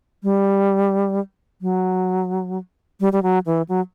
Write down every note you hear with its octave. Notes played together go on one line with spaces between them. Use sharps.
G3
F#3
G3
G3
F#3
E3
F#3